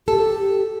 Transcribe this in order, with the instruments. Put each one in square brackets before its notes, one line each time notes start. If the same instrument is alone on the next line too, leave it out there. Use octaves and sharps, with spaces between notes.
[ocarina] G4 [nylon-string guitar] A4